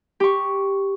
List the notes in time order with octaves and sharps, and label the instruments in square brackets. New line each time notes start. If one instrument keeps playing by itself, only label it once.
[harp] G4 C#6